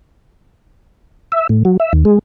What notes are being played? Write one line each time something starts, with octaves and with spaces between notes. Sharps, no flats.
E5
A2
F#3
E5
D#2
G#3